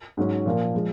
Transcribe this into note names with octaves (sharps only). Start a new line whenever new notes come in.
G#2 F#3 C#4
A#2 F3 A#3
F3 G#3